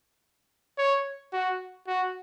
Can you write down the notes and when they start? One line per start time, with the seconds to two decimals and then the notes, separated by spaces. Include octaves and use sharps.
0.78 C#5
1.33 F#4
1.88 F#4